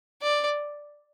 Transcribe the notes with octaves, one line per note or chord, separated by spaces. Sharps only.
D5